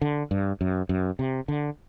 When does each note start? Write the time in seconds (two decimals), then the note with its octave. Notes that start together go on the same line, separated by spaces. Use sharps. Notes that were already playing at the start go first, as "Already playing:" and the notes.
0.02 D3
0.31 G2
0.61 F#2
0.89 F#2
1.19 C3
1.48 D3